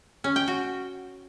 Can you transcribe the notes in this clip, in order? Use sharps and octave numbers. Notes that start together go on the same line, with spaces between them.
C#4
G5
F#4